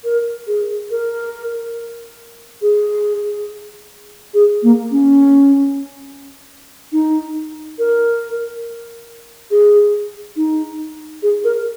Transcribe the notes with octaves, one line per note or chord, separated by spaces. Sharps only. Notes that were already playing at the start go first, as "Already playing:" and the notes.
A#4
G#4
A#4
G#4
G#4
A#3
C#4
D#4
A#4
G#4
D#4
G#4
A#4